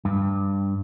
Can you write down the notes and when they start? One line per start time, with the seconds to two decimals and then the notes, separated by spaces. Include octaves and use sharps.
0.05 G2